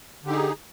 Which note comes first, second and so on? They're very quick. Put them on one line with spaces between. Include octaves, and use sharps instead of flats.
D3 G4 D#4 G#4